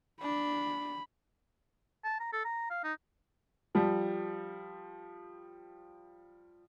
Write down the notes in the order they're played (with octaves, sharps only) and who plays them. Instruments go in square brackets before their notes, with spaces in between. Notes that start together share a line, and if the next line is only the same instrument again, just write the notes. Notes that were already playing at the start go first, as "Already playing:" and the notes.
[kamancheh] D4 [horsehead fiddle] B5
[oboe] A5
A#5
A4
A#5
F5
D#4
[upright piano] F3 G3